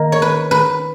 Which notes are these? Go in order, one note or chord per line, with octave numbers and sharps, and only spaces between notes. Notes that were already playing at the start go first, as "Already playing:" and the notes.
Already playing: D#3 A#3 D#4
C#5
B4
B4